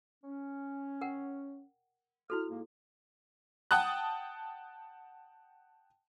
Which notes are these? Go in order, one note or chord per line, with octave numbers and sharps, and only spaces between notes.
C#4
A#4 F#5 G5
E4 F#4 A4 F6
G#2 A#3
F#5 G5 A5 D#6 F#6